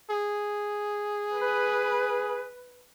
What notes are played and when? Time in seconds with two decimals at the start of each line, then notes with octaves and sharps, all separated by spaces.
0.10 G#4
1.35 B4